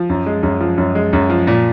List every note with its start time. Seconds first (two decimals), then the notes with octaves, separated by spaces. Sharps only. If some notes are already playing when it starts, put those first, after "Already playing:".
Already playing: F3
0.10 F#2
0.26 G#3
0.43 F#2
0.61 F3
0.77 F#2
0.95 G#3
1.13 F#2
1.30 F3
1.47 A#2